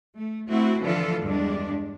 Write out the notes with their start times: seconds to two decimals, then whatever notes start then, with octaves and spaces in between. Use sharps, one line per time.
0.16 A3
0.48 A3 C4 E4 F#4
0.82 D3 E3 F3 F4 A4
1.22 E2 G2 G#3 D4